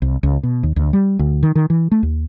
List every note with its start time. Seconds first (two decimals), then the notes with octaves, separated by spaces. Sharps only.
0.02 C2
0.23 C#2
0.43 B2
0.63 D#2
0.76 D2
0.93 G3
1.19 D2
1.43 D#3
1.55 D#3
1.70 E3
1.91 A3
2.03 D#2